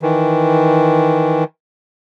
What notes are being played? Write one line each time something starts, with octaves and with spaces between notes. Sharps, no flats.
D#3 E3